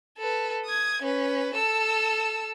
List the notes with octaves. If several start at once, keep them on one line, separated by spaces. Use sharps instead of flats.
A4 B4
D#6 G#6
C#4 B4
A4 E6